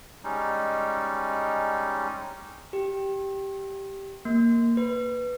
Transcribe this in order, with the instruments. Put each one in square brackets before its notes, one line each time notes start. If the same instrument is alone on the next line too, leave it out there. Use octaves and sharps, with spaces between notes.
[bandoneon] G3 G#3 C#4 D#4
[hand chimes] G4
A#3
B4